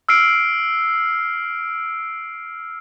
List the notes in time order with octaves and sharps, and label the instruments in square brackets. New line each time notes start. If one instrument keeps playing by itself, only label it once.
[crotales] E6 F6 C7 D7